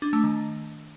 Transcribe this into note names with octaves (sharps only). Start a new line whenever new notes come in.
D4
A3
D#3